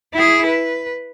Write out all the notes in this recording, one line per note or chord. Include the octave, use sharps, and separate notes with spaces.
E4 G#4
B4